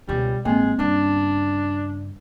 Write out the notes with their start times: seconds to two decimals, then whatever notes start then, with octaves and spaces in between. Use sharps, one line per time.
0.09 C#2 B2 G3
0.45 A1 G#3 A#3 C4
0.79 G2 C#3 D4